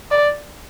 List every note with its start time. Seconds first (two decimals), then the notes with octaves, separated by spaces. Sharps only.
0.11 D5